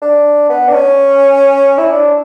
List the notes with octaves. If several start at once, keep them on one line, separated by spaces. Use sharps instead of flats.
D4
B3
D4
C#4
E4
D4